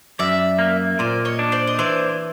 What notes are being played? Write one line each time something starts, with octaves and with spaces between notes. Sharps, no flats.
F#2 D5 E5
A#3
A#2 C5 D5
C#5 D#5
D4
C5 D5
D#5
E3 C5 D5